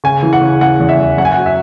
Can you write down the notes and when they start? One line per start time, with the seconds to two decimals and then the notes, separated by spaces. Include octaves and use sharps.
0.04 C#3 G#5
0.23 E3
0.33 F#5
0.41 C#3
0.61 C#3 F#5
0.80 E2
0.89 E5
0.99 E2
1.17 F#2 F#5
1.25 G#5
1.32 F#5
1.37 F#3
1.46 E5